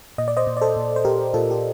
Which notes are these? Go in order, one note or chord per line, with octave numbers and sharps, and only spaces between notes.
A#2 D#5
D5
C5 D#5
A#2
D5
A4 C5
A#2
C5
A#2 G4 A#4
A#2 F4 A4
G4